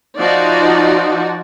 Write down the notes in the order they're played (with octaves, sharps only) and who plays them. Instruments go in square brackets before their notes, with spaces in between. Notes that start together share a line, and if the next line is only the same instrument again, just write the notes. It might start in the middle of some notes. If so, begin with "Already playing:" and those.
[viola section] F3 D#4 F#4 D5